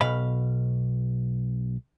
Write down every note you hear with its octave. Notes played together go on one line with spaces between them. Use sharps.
B1 B2 F5 B5